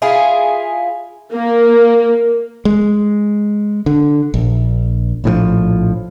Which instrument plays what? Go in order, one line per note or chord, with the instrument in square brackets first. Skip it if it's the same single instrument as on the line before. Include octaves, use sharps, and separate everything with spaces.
[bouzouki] E4 F4 G#4
[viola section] A#3
[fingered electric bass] G#3
D3
A#1
[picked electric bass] A#1 A2 D#3 F3